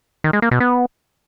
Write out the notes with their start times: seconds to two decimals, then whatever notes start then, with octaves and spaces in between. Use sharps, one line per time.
0.24 D#3
0.33 G#3
0.42 A#3
0.51 B2
0.60 B3